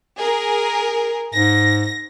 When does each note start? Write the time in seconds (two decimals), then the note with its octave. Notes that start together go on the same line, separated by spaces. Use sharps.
0.17 G#4 A#4
1.34 G#2 A#6